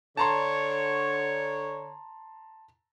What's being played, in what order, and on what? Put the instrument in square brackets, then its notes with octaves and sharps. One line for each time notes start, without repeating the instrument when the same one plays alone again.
[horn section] D3 C#5 [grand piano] A5 A#5 C6